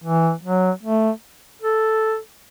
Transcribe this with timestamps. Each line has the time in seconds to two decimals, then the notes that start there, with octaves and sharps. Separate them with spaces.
0.04 E3
0.44 F#3
0.83 A3
1.62 A4